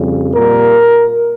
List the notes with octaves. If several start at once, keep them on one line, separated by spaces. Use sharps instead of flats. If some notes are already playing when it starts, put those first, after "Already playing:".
Already playing: F2 C#3 G3
A#2 G3 A#4